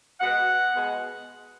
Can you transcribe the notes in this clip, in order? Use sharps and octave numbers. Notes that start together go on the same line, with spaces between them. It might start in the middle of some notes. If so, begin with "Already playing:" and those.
B2 G#3 B3 F#5
B2 G#3 B3